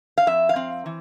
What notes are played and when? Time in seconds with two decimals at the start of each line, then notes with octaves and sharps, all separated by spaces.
0.18 F5
0.27 F2 E5
0.49 F5
0.56 C4
0.86 E3